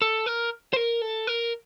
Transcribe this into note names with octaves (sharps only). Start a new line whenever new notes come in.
A4
A#4
C5
A#4
A4
A#4